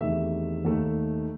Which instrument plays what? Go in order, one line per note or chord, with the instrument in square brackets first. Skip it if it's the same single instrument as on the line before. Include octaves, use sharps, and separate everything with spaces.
[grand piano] E2 C3 D#3 A3 E5
D#2 D#3 A3